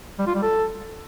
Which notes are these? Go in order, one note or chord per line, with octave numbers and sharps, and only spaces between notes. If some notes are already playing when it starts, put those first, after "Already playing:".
G3
F4
G3
A4